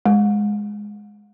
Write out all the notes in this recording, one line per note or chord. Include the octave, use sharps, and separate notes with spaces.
G#3